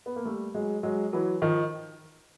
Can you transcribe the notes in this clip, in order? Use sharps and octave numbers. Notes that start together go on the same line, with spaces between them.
B3
A#3
G3 A3
F#3 G#3
F#3 G#3
E3 F#3
D#3 F3